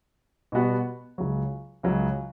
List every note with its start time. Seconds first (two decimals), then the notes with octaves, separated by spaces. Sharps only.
0.52 B2 G3 B3 F#4 B4
1.18 C#2 C#3 F#3
1.83 C#2 C#3 F#3